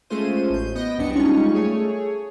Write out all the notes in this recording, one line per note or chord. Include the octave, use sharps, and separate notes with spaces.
G#3 A3 C#4 F4 C5 D#7
A1 G6
B3 D#5 G5 A#6
C2 F#2 B3 D4 C#7
G3 G#3 C#4 D#4 F4 C#6
A3 G#4 C#5